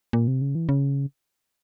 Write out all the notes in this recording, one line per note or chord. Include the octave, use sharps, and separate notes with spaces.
A#2
C3
C#3
E3
C#3